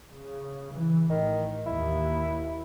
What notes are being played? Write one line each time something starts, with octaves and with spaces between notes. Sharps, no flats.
C#3
E3
A1 D#3
D#2 E4